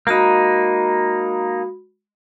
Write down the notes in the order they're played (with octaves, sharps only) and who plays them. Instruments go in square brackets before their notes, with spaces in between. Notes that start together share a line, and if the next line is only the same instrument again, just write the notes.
[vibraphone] G#3 F#4 B5 [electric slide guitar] A#3 D#4